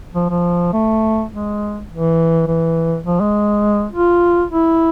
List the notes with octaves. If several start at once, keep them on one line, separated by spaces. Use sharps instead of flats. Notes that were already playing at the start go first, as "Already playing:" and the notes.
F3
F3
A3
G#3
E3
E3
F3
G#3
F4
E4